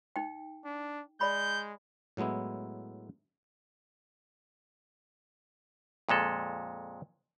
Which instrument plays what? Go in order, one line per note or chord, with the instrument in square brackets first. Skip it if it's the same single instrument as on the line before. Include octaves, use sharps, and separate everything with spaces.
[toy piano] D#4 G5
[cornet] D4
[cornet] G#3 [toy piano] D5 B5 [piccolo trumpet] G6
[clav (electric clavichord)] A2 F#3 G#3 B3 E4
F2 A#2 G#3 A4